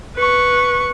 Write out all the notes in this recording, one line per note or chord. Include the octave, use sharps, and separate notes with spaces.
B4 C#6